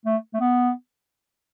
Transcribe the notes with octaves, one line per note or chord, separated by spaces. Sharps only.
A3
A3
B3